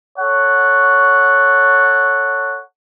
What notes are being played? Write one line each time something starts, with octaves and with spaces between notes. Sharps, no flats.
A4 C#5 F#5